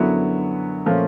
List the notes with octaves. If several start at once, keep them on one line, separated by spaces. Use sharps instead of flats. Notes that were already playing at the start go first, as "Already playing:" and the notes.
Already playing: F#2 D3 F#3 B3 E4
A#2 F3 A3 C#4